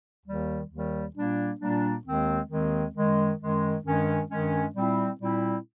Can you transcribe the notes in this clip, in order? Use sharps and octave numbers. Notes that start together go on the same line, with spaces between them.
D#2 D#3 G3
D#2 D#3 G3
A#2 G3 A#3 D4
A#2 G3 A#3 D4
D#2 D#3 G#3 C4
D#2 D#3 G#3 C4
F#2 D#3 G#3
F#2 D#3 G#3
G2 D#3 G#3 C#4
G2 D#3 G#3 C#4
A#2 G3 C4 E4
A#2 G3 C4 E4